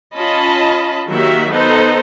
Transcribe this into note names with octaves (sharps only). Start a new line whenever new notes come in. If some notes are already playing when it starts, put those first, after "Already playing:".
C#4 F4 D#5 A5 B5
D#3 F#3 A#3 F#4 G4 E5
B3 D#4 A4 C5